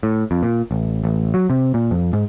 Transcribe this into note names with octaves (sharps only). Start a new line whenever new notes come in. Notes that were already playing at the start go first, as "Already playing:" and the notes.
A2
F2
A#2
A1
A1
F#3
C3
A#2
F2
G#2